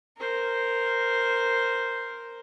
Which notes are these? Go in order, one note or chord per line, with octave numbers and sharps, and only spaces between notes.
A#4 C5